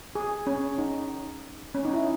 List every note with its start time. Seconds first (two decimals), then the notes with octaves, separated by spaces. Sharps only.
0.15 G#4
0.47 C#4
0.78 D#4
1.75 C#4
1.85 D#4
1.94 E4